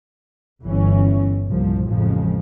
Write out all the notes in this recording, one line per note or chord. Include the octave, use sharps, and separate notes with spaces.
G1 E3 C#4
C2 G2 A#2 F3
A1 F2 C#3 F3 G#3